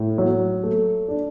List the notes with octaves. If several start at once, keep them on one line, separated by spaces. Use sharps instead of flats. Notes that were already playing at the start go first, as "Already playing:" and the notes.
Already playing: A2
F#3
A3
D4